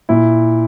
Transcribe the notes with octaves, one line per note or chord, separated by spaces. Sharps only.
A#2 E4